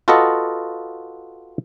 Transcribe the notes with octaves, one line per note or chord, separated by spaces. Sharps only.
F4 F#4 A4 B4 D#5 F#5